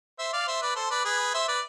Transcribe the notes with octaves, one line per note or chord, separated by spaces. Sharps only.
C5 E5
D5 F5
C5 E5
B4 D5
A4 C5
B4 D5
G#4 B4
C5 E5
B4 D5